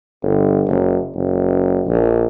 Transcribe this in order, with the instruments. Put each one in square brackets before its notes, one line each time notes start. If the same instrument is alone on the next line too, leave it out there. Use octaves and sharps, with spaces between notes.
[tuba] G1
F#1
F#1
A#1